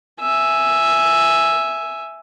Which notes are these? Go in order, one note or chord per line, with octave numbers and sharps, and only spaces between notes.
E5 G#5